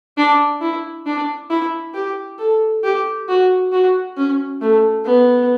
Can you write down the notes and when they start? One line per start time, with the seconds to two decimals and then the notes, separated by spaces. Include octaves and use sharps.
0.18 D4
0.61 E4
1.06 D4
1.50 E4
1.94 G4
2.39 A4
2.84 G4
3.29 F#4
3.72 F#4
4.17 C#4
4.61 A3
5.06 B3